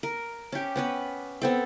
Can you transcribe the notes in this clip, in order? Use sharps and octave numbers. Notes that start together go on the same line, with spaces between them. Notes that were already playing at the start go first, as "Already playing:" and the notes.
A#4
C#4 G4
B3 C#4 B4
B3 C4 A4